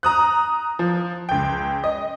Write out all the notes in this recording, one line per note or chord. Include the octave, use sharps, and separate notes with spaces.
A#5 D#6 F#6
F3
C#2 G5
D#5